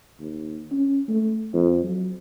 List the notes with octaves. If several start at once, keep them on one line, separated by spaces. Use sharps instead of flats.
D#2
C#4
A3
F2
F#3